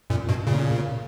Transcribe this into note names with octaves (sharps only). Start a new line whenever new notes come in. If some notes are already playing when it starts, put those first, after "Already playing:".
F#2 A#2
G2 B2
A#2 C#3